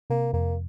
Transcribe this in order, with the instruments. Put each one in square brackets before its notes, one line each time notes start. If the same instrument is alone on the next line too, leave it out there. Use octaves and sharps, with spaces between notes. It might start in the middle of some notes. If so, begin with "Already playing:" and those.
[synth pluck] C3 [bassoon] A#3
[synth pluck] F2 [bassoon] A#3